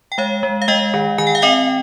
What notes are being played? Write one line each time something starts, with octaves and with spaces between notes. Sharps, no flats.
G5
G#3 C#5 F5
G#3
F5
G#3 D#5 G5
D#3
D#3 G#5
G5
F5
C4 D#5 G5